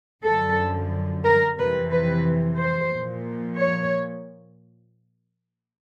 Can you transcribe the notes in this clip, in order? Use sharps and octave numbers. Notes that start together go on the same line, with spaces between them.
F#2 D3 F3 A4
A#4
F2 C3 E3 B4
B4
C5
A#2 F3
C#5